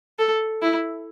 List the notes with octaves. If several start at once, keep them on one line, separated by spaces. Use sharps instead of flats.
A4
E4